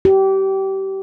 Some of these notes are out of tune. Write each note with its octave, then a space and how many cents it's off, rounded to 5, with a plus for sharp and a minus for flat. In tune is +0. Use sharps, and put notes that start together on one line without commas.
G4 -25